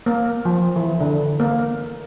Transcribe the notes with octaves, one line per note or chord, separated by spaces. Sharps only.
A#3
F3
E3
D3
A#3